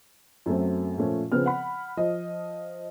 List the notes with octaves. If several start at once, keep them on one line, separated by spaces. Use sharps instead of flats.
F#2 F#3 A3 C4
A#2 F3 A3 C#4
C#3 F3 B3 C4 F6
F#5 B5
F3 D#5